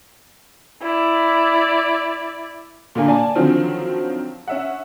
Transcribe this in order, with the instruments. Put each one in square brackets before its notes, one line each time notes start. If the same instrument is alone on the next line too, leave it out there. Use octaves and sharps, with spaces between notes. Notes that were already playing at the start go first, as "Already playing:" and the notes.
[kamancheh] E4 D5
[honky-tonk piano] A#2 D3 A#3 G#5
D5 G#5 A5
D3 D#3 F3 F#3 C4
C#4 E5 F#5